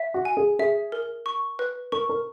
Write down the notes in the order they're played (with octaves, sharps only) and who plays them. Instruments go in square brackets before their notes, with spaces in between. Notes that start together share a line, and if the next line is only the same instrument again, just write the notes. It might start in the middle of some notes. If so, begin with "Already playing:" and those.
Already playing: [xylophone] E5
[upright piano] F#4
[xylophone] G#5
[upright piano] G#4
[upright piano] G#4 [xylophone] E5
[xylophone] A#4
C#6
B4
[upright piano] A#4 [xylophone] C#6
[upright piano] A#4